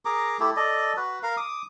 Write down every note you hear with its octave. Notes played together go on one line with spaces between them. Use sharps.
G#4 A#4 A#5 D6
A3 E4 G4 A4
A4 D5 D#5
F#4 B4
A#4 F5
D6 D#6